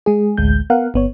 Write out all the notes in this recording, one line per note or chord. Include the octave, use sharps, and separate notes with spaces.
G#3 G#4
A1 D2 G#3 G6
B3 A#4 F5 F#5
G1 B3 C#5